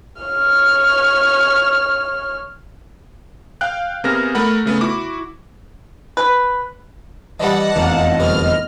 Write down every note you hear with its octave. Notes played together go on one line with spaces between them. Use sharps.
C#5 F6
F5 G5 F#6
C3 A#3 B3 G#4 F6 A#6
A3 A#4 F#5 B5
C#3 A3 B3
E4 F#4 D6
B4
E3 G3 D#5 F#5 A5
F1 E2 A#3
C2 B2 D3 F6